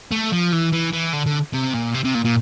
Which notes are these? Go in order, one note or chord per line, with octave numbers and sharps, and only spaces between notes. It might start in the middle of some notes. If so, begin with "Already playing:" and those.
A3
F3
E3
E3
E3
D3
D3
C3
A#2
C3
C3
A#2
A#2